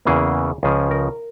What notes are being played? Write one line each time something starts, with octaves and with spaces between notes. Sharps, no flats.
E2 C#3 E3 A#3 G#4
C#2 C#3 F3 G#4
A#4